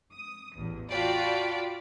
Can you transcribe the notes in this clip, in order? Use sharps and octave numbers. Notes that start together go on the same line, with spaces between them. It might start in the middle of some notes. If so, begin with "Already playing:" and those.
D#6
A1 E2
F4 F#4 D5 G5 A5 B5